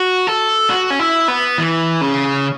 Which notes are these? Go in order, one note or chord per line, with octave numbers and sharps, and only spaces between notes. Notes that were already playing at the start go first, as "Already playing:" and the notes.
Already playing: F#4
A4
F#4
C#4
E4
B3
E3
C#3